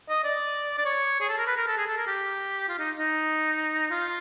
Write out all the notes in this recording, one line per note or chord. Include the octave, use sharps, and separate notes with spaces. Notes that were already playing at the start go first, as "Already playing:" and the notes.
D#5
D5
D5
C#5
G#4
A4
A#4
B4
A#4
A4
G#4
A4
A#4
G4
F4
D#4
D#4
F4